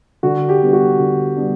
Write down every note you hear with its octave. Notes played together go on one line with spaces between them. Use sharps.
D3 F#4
G4
G3 B3 D4
F#4
D3
G3 B3 D4